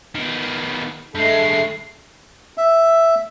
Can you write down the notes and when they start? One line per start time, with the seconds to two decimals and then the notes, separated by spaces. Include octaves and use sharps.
0.15 D#3 B3
1.15 G2 G#3 A3 C7
2.57 E5